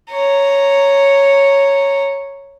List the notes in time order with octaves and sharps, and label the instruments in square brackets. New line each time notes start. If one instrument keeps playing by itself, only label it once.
[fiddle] C#5 A#5